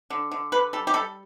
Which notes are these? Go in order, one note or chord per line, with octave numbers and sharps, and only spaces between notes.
D3
D3
D3 B4
G3 A4
G4
G3 A4